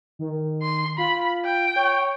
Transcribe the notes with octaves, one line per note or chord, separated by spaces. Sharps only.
D#3
C6
F4 B5
G5
C#5